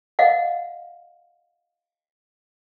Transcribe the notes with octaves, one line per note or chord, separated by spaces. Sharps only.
D#5 F5 F#5